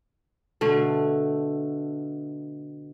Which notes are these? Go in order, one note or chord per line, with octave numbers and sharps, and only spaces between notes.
B2 D3 A3